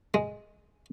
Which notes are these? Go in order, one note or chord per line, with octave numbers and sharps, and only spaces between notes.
G#3